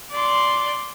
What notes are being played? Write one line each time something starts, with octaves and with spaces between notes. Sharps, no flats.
D5 C6